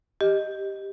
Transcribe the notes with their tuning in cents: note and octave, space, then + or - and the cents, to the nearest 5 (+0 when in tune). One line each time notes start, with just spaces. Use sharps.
G4 +0 D#5 +0